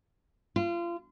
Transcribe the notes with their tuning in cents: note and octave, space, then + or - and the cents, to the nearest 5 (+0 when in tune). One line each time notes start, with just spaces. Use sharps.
F4 -30